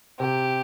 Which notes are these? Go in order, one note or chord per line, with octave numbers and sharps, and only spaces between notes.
C3 G4